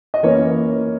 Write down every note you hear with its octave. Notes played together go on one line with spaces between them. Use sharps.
D#5
E3 A#3 C#4 C#5